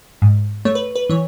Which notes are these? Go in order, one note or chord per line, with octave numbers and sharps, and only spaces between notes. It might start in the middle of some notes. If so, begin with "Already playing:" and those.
G#2
A3 C#5
B4
B4
E3 C#5